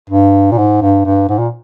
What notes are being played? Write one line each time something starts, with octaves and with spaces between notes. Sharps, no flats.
G2
A#2
G#2
G2
G2
G#2
A#2